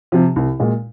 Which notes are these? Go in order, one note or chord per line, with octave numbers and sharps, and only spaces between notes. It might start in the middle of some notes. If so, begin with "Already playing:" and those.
C3 F3
C2
A#2 G#3